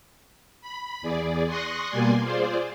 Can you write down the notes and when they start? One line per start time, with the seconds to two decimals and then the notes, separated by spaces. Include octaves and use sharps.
0.61 B5
1.02 E2 G#4 D5
1.46 C6 C#6 D#6 F#6 A#6
1.89 B2 G3 A#3 D5 G#5 C6
2.21 F4 G#4 C5 D5